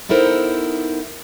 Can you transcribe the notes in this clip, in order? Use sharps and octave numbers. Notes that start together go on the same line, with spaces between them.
B3 D#4 E4 A4 A#4 C5